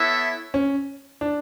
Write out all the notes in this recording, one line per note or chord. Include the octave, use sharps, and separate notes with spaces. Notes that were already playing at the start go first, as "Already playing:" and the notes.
Already playing: B3 E4 A4 C#5 E5
C#4
D4